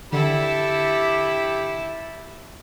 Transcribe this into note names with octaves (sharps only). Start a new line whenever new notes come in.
D3 E4 G4 A4 B5